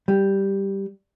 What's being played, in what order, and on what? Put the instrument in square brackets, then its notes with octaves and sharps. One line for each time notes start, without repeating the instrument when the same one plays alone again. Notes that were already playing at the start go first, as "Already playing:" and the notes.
[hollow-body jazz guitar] G3